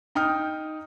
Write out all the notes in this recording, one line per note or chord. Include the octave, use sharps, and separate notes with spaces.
D#4 G5 D#6 F6